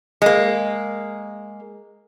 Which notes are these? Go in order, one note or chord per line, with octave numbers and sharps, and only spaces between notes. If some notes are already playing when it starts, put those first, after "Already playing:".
G#3 A#3